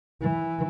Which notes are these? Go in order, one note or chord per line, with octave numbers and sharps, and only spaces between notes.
E3